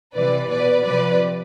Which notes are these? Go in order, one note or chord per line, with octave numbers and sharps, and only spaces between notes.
C3 E3 B4 D5
B2 B4 D5
C3 F3 B4 D5